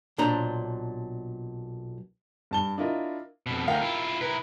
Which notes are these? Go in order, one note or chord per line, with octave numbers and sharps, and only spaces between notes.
B1 A#2 D4 C5 A#5
G2 A5 G7
D4 E4 F4 A#4 D#5
F2 B2
D2 A#4 F5 G5
E4 F4
E4 A#4 B4